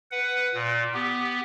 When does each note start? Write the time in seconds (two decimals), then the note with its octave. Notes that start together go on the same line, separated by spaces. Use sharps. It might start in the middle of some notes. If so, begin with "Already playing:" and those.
0.11 B4 F#5
0.54 A#2
0.94 B3 G4